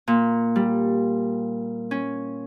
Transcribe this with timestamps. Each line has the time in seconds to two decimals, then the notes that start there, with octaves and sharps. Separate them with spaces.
0.08 A#2
0.56 G3
1.91 C#4